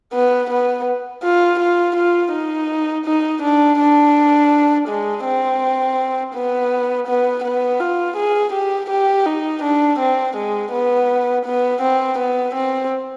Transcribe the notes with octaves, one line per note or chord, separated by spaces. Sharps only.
B3
B3
F4
F4
F4
D#4
D#4
D4
D4
G#3
C4
B3
B3
B3
F4
G#4
G4
G4
D#4
D4
C4
G#3
B3
B3
C4
B3
C4